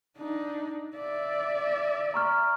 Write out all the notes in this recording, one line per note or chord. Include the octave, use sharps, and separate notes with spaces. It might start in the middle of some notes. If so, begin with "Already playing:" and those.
D4 D#4
D5 E5
A#5 C#6 F6